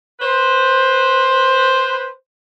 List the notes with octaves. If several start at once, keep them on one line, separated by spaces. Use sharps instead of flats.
B4 C5